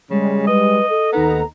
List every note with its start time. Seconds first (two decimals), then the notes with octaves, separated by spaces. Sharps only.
0.10 C#3 G3 G#3
0.47 B4 D#5
0.90 A4
1.13 D#2 B3 D#4 A#5